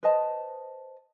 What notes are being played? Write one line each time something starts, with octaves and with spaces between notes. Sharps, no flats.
B4 C5 D#5 A5